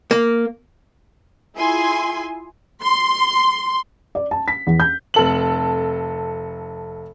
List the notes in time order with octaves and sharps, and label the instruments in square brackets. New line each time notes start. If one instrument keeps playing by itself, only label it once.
[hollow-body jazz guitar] A#3
[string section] E4 F4 G#4 G#5 C6
[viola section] C6
[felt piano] D5
A5
B6
E2
G6
[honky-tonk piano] F1 A4 F#7